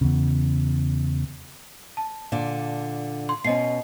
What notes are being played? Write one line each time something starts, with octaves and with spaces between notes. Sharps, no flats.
E2 C#3
A5
A#2 D3 D5
C6
B2 C#4 D#5 C7